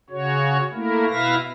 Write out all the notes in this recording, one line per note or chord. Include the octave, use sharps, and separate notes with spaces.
C#3 F#4 C#5
A3 A#3 E4 A#4
B2 E4 B4 E5 F5 A#6